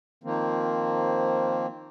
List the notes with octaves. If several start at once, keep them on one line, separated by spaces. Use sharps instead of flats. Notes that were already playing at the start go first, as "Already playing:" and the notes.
D#3 F3 A#3 C4